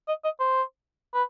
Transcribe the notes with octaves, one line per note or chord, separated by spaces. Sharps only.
D#5
D#5
C5
B4